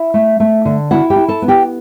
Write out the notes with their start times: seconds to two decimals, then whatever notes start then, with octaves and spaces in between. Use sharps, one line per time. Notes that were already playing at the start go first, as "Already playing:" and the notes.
Already playing: E4 E5
0.14 A3
0.40 A3
0.65 D3
0.91 E4 F#4 F#5
1.10 G4 G5
1.16 E4
1.28 A4 A5
1.42 B3
1.48 G4 G5